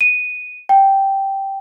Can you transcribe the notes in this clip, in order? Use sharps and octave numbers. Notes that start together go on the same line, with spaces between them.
D#7
G5